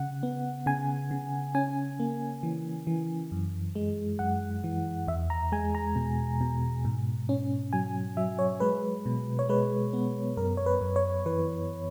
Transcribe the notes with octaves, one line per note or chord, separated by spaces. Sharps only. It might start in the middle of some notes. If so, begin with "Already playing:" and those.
Already playing: C#3 F#5
B3
C#3 G#5
C#3
C#4 G#5
A#3
E3
E3
F#2
G#3
F#2 F#5
E3
E2 E5
A#5
G#3 G#5
A#5
B2
B2
G#2
C#4
F#3 G#5
F#3 E5
C#5
G#3 B4
B2
C#5
G#3 B4
B3
F#2 A#4
C#5
B4
F#2
C#5
E3 B4